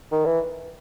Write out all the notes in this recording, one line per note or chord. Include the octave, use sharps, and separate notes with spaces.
D#3
E3